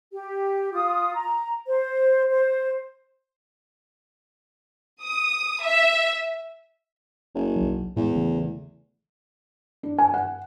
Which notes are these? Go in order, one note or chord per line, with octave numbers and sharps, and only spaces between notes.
G4
F4 D#6
A#5
C5
C5
D#6
E5
F#1
B1 F#3
E2 A2 G#3
C#3 E3 A3
D4
G#5
F#5